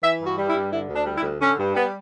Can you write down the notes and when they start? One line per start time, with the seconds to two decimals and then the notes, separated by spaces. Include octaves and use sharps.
0.04 E3 E5
0.21 G2 F#4
0.37 G3
0.48 E4
0.54 G2
0.72 D3 E4
0.90 D2
0.95 D4
1.06 G3
1.17 E4
1.23 D2
1.41 D3 C#4
1.58 G2
1.75 G3 B3